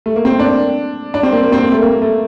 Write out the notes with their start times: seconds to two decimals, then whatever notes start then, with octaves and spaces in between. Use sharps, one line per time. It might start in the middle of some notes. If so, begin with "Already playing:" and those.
0.06 A3
0.16 A#3
0.25 C4
0.39 D4
1.14 D4
1.23 C4
1.33 A#3
1.43 A#3
1.52 C4
1.63 A#3
1.72 A3
1.82 A#3
1.92 A#3
2.02 A3